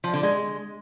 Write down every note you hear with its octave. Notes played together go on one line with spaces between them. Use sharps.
F3
D3
G#3